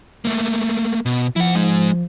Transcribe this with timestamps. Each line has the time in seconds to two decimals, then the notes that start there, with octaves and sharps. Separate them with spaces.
0.25 A3 A#3
1.06 B2
1.36 F3 E4 F#5
1.55 G#3 D#4